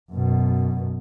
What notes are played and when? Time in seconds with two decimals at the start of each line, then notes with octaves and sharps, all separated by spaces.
0.12 F#2 B2